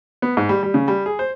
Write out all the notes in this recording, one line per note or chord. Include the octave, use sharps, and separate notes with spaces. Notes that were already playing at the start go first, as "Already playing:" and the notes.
B3
G#2
G3
G3
C#3
G3
G#4
C5